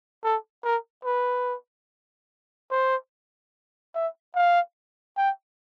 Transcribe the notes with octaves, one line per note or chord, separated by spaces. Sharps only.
A4
A#4
B4
C5
E5
F5
G5